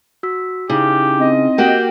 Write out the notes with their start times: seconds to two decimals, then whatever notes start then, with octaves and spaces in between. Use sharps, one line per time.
0.23 F#4 E6 B6
0.70 C#3 D#4 E4 G4
1.19 C4 D#5
1.58 A#3 F#4 G4 G5